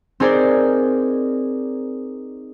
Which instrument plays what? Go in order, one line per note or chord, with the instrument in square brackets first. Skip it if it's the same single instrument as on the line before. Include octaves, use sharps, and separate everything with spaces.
[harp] C4 D#4 G#4 A#4 C5 D5